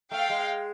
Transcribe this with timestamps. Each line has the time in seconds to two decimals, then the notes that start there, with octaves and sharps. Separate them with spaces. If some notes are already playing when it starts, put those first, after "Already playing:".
0.11 A3 F5 G5
0.30 G#3